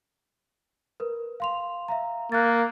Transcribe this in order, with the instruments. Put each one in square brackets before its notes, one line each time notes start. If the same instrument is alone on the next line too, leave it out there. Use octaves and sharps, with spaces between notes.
[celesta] A#4 B4
F5 C6 F7
E5 F5 A#5
[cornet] A#3 [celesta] F#6 A6